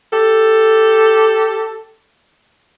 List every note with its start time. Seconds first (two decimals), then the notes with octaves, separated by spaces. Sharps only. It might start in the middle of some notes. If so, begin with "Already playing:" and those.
0.13 G4 A4